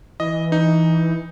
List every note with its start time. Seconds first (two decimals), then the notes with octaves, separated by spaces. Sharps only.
0.20 E3 D#5
0.52 E3 D#4